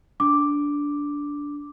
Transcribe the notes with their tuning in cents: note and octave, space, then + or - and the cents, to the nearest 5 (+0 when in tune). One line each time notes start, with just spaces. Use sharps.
D4 -15 D6 +0